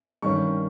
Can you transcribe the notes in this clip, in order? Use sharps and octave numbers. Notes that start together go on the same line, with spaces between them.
G2 D#3 G3 C#4 C#6